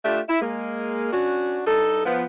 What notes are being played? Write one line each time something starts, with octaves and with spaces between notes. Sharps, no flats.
A3 D4 F4 G4 E5
E4
G#3 A#3
C#4 D4 F#4
G2 D#4 A4
F3 B3